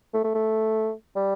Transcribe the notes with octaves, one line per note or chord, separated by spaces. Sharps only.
A3
A3
A3
G3